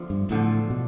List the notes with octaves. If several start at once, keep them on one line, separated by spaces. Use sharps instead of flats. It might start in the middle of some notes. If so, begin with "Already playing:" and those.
Already playing: E2 D3 F3
G2
E2 A2 D3 F3
B2